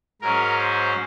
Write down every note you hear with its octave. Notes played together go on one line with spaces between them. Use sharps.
G#2 F#3 C#4 A#4
C5